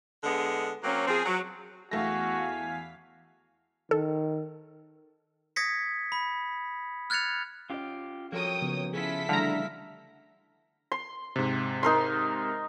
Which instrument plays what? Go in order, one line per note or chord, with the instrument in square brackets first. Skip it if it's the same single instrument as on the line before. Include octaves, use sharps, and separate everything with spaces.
[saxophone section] D3 G#3 B3 G#4
F#3 A#3 C4 C#4
F3 C4 G#4
F#3
[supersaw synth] E2 F5 B6 [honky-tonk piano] A3 A#6 [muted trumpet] F#4 [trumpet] G#5
[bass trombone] D#3 [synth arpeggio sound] A4
[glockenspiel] D#6 G#6 A#6 B6 C#7
B5
F6 F#6 G#6 A6 C#7 F7
[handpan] C#4 D#5 [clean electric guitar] F4 G4
[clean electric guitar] C2 F#3 A#3 [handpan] F3 A4 [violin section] C#5 G5 D#6
[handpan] C#3 F3 B3
[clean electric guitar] C#4 F4 [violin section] E4 A4 B6 [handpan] G#4
[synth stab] D3 A#5 [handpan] E3 G3 A3 [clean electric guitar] E5 F5
[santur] C6
[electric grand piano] G#2 C3
[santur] D#4 A#4 C6